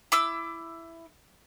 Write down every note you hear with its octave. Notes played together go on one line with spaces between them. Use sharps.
E4 D6 E6